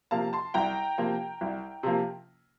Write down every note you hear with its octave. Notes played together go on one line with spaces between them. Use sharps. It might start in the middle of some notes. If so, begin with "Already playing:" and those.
C3 F3 A#3 F5 A5
A5 C6
C2 G5 A#5
C3 F3 A#3
C2
C3 F3 A#3